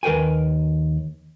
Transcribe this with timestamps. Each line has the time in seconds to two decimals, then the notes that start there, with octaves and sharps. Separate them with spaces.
0.03 D#2 A#4 B4 G5 G#5